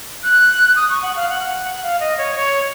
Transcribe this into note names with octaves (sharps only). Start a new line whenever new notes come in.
F#6
D#6
C#6
F#5
F5
F#5
F5
D#5
C#5
C#5